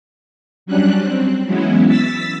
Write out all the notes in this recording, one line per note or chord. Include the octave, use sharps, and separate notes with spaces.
F#3 G3 C#4 D4 F#6
C4
E3 F#3 G#3 B3 C#4 E4
E6 A6 B6